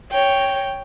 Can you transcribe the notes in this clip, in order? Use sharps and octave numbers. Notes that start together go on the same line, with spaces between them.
C#5 G5